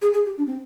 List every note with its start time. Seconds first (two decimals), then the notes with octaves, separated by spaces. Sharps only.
0.02 G#4
0.14 G#4
0.26 G4
0.38 D4
0.47 C4